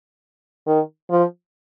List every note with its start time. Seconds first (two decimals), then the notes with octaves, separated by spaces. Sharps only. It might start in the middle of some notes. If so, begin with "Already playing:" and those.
0.67 D#3
1.10 F3